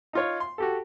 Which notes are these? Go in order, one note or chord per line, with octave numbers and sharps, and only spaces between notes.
D#4 F4 C#5
C6
F#4 G4 A4